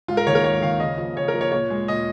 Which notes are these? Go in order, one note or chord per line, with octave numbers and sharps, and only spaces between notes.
G#2 F4
A#4
D#3 A#3 A#4 C#5
G#2 C#5
D#3 A#3 F5
C#3 D#5
F3 A#3
C#3 C#5
A#4
F3 A#3
C#5
A#2 C#5
G#3
A#2 D#5